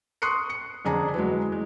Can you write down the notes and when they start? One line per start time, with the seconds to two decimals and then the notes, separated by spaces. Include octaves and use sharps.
0.22 C6 C#6 D#6 F#6 C7 C#7
0.50 C#7
0.85 F2 D3 D4 G#4 G#5 A#5
1.14 E3 F#3 G#3
1.52 G#3